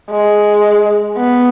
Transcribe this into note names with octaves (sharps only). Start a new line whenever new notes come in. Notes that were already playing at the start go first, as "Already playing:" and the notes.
G#3
B3